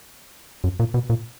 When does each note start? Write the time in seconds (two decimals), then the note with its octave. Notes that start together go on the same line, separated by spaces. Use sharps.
0.64 F#2
0.80 A#2
0.94 B2
1.10 A#2